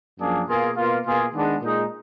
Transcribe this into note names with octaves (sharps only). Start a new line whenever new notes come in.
F#2 F3 A#3 D4 G#4
B2 A#3 F4 G#4
B2 A#3 F4
B2 A#3 F4 G#4
D#3 G#3 B3 D4
A#2 G#3 D#4 G#4